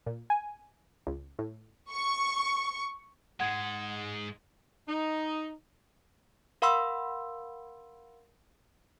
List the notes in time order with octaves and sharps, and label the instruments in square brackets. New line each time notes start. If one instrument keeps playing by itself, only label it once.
[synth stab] A#2
G#5
C#2
A2
[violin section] C#6
[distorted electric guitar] G#2 G#3 [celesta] F#5 G#6
[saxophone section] D#4
[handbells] A#4 F5 F#5 B5 C6 E6